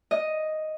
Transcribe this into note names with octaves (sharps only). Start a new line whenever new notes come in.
D#5